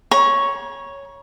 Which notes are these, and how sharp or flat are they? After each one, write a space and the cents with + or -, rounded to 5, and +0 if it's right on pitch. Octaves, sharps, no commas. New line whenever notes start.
C#5 +0 A#5 +40 C#6 +0